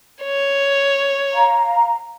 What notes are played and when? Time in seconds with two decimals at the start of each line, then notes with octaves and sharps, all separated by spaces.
0.23 C#5
1.34 F5 A#5